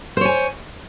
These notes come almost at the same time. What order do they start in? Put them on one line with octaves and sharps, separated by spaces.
C5 C#5 G#5